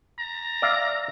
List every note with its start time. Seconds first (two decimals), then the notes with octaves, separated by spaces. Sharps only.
0.19 A#5
0.62 D5 E5 F5